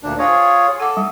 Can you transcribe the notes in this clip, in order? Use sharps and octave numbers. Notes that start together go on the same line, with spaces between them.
D2 A#2 D4
F4 G#4 C5 C#5
A4 F#5 D6
G3